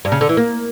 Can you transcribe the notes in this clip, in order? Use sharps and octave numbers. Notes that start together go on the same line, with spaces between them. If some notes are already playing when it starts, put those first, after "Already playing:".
G2
C#3
D3
E3
A#3